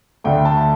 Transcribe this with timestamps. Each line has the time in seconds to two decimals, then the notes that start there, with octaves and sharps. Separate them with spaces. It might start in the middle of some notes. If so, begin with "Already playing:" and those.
0.24 D2 D3 A3 G5
0.45 A5